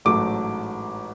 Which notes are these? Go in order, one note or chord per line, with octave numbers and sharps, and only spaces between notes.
A1 G#2 F#3 A3 D6